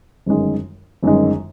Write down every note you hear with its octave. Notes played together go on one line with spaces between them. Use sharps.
G1 F#2 D#3 G#3
G1 F#2 D#3 G#3